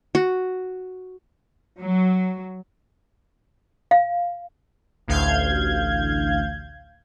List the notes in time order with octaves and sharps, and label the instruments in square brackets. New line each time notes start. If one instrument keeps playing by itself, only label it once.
[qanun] F#4
[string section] F#3
[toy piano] F5
[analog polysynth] A1 D2 F5 G6 G#6